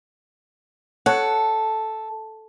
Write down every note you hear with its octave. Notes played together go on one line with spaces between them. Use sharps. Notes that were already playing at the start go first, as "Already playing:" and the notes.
A4 C#5 F#5